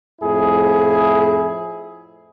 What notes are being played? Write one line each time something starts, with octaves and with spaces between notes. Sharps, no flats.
F2 A2 E4 G#4